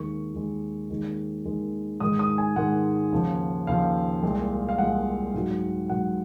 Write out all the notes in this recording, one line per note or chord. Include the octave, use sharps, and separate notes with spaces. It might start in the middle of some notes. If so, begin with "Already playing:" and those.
Already playing: D#2 D#3 G#3 C#6
D#2 D#3 G#3
D#2 D#3 G#3
D#2 D#3 G#3
G#2 D#3 G#3 D#6
D#6
G#5
G#2 D#3 G#3 F#5
D#2 C#3 F3
D#2 C#3 F3 F5
C2 A#2 G#3
F5
C2 A#2 G#3 F#5
G#2 F#3
G#2 F#3 F#5